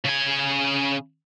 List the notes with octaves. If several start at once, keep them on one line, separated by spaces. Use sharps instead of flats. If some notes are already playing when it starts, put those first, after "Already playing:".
C#3 G#5